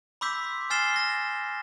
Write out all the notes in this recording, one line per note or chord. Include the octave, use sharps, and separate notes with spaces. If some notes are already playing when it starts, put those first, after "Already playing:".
B5 C6 D6 E6 G6 B6
G#5 F6 A6 C7 E7 G7
A#6